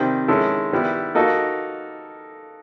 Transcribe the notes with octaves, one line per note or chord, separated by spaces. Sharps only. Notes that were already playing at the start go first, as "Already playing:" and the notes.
Already playing: C3 D#3 G3 C4
D#3 G#3 C#4 E4 A4
D#3 G3 B3 E4
A#3 D#4 F#4 A4